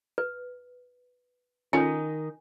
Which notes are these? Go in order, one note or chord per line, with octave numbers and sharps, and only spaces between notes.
B4
D#3 C#4 D#4 F4 A4 G#5